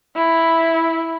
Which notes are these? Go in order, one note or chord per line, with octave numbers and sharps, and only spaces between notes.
E4